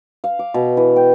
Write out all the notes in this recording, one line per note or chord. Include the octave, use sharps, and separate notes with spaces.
F5
D6
B2
E3
G5